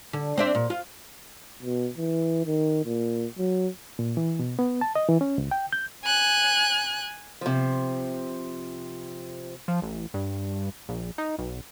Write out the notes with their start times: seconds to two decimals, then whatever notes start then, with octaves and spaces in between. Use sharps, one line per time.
0.13 D3
0.38 C4 D4 E5
0.55 A#2
0.70 F4
1.63 B2
1.97 E3
2.46 D#3
2.85 A#2
3.38 F#3
3.99 A#2
4.17 E3
4.39 B2
4.59 B3
4.81 A5
4.95 D#5
5.09 E3
5.21 C#4
5.38 C#2
5.51 G5
5.73 G6
6.04 G#5 F#6
7.41 C3 F3
9.68 F3
9.82 A1
10.14 G2
10.88 A#1
11.18 D#4
11.39 B1